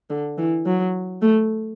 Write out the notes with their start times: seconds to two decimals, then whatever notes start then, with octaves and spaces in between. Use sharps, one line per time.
0.10 D3
0.38 E3
0.66 F#3
1.22 A3